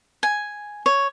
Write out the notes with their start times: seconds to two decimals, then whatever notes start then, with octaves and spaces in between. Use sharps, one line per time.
0.23 G#5
0.86 C#5